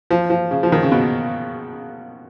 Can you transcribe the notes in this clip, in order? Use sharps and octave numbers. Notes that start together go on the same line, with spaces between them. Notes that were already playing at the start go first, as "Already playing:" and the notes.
F3
F3
C#3
F3
D#3
C#3
B2